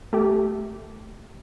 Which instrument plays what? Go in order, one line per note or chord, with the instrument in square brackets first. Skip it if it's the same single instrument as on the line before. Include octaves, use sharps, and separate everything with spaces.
[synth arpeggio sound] A3 G4